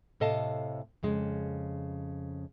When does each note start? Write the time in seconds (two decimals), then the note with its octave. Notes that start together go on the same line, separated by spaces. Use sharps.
0.20 A2 C3 A4 D#5 F5 A5
1.03 F2 C#3 G#3